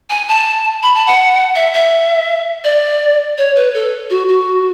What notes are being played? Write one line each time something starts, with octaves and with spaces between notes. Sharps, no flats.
G#5
A5
B5
A5
F#5
E5
E5
D5
C#5
B4
A4
F#4
F#4